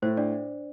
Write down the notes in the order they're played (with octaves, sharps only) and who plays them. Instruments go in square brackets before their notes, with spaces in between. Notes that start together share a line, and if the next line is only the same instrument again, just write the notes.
[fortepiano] A2 [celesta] C5
[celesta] D4 D5